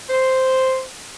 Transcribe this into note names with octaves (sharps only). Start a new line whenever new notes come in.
C5